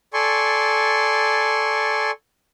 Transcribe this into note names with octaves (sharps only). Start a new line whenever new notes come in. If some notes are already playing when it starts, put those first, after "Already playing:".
A4 D5 G#5 C6 C#6